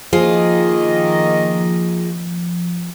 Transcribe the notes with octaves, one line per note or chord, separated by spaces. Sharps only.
D#3 F3 A#3 F4 G#4 D#5 F5